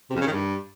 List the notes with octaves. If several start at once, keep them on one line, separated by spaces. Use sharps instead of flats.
C3
F2
C#3
D#3
G2